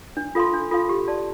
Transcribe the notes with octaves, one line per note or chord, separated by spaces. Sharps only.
D4
F4 A4 F5 C6
D4
F4 A4 F5 C6
G4
D5 A5 C6